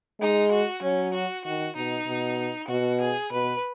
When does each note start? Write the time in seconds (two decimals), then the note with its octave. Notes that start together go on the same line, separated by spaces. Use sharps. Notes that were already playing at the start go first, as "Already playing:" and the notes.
0.20 G#3 D#4
0.52 F#4
0.82 F#3 C#4
1.13 F#4
1.44 D#3 F#4
1.76 B2 D#4
2.07 B2
2.69 B2 F#4
3.00 G#4
3.32 B2 B4